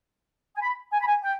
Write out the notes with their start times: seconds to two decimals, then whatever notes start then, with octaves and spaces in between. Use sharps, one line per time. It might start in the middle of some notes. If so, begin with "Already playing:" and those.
0.54 G#5
0.59 B5
0.91 G#5
0.99 B5
1.06 G#5
1.22 G5